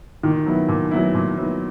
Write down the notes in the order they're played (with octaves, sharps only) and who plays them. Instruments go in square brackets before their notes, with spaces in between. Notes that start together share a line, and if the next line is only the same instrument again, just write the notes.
[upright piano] A#2 [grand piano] D#3
[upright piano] F#3 B3 E4
A#2
F#3 B3 E4
A#2
F#3 B3 E4